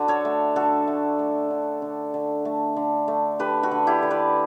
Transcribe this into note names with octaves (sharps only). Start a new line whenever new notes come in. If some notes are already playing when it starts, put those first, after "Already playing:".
Already playing: D3 F#4
A4 C#5
A3
D3 F#4 A4
A3
A3
D3
D3
D3
A3
D3
A3
D3 G4 B4
F#4 A4
D3
E4 G4
D3
B4 D5